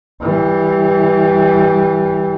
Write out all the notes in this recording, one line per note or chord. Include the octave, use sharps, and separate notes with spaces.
E3 G3